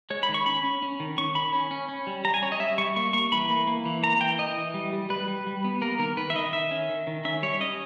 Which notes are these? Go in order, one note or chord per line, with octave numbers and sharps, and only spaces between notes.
G#3 C#5
B5
D#3
C#6
C#4 B5
C#4
C#4
D#3
C#4 C#6
D#3 B5
C#4
C#4
C#4
G3
G3 A#5
G#5
C#4 C#5
D#5
G3 E5
G3 C#6
A#3 C#6
A#3 C#6
E3 B5
A#3
A#3
E3
A#3 A#5
E3 G5
E3 D#5
E3
G3
G3
G3 B4
G3
G3
B3
A#3 A#4
D#3 A#4
D#3 B4
E5
D#3 D#5
D#3 E5
C#4
D#3
D#3
C#4 E5
G3 C#5
C#4 D#5